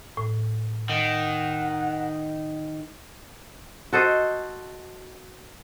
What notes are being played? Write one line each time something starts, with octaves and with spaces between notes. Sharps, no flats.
A2
D#3 F#5
F#4 A4 C5 D#5